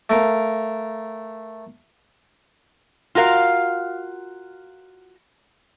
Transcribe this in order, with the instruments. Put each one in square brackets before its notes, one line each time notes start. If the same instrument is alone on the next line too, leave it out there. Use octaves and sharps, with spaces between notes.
[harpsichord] A3 A#4 F5
[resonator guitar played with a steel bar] F4 F#4 A#4 F5